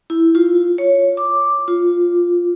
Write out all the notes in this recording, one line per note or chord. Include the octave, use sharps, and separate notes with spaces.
E4
F4
C#5
D6
F4